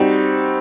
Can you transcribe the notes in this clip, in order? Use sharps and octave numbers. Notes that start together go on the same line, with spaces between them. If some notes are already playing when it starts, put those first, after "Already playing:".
Already playing: G3 C4 D#4 F#4